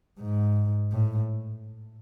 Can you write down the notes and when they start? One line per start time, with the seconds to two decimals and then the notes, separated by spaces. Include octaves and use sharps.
0.20 G#2
0.92 A2